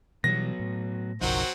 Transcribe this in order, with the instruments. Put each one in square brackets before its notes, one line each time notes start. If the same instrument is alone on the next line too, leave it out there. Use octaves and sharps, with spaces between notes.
[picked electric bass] B2 E3 G3 [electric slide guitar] F#3 B3 [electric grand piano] A#6
[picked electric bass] A2
[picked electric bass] F#1 B1 F3 [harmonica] F#3 C4 F#4 [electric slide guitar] D#4 A#4